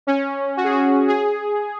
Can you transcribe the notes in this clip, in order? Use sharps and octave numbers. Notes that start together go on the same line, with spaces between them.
C#4
F#4
G#4
F#4
G#4